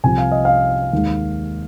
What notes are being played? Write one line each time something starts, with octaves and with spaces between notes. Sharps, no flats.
C2 C3 F3 G#5
F5
D#5
F5
D#2 D#3 G#3